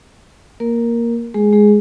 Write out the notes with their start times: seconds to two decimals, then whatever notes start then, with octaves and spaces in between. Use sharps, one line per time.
0.60 A#3 A#4
1.34 G#3 G#4
1.53 G#3 G#4